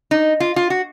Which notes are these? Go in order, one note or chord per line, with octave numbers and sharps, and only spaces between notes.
D#4
F4
F4
F#4